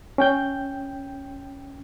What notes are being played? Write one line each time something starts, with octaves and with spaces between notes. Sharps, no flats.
C#4 G5 G6